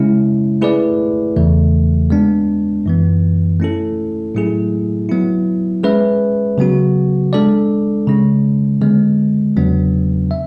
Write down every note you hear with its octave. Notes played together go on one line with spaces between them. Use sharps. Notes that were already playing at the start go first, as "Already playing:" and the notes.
Already playing: C#3 G#3 C#4 E4
A3 E4 G#4 B4 D5
E2 C#3 E3 A3
G#3 B3 D4
F#2 E3 B3
A3 C#4 E4 A4
A2 F#3 A3 E4 G#4
F#3 B3 E4
G#3 C#4 G#4 B4 E5
C#3 F#3 B3 F#4
G#3 D4 A4 D5
C#3 G#3 C#4
D3 G#3 B3
E2 C#3 F#3 B3 D4
E5